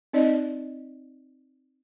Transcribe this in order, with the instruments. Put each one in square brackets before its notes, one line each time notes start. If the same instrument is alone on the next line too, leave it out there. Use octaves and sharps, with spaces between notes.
[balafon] C4 D#4 D5 D#5